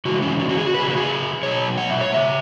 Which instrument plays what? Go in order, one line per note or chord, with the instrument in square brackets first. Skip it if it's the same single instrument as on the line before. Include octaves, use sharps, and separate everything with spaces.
[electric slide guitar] C#3 E3 G#3 F#4
C#4
C#4
F#4
G#4
F#4
C#3 B4
F#3 G#4
F#4
G#4
B2 F#3 C#5
F#5
E5
C#5
C#3 G#3 E5